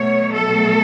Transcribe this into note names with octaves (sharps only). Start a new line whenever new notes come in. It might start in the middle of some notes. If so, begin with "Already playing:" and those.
Already playing: B2 F#3 A3 C#5
A4